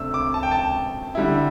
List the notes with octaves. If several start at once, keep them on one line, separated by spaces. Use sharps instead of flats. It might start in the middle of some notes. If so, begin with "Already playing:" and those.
Already playing: C3 A3 D4 E6
D6
A5
G5
A5
D3 G3 E4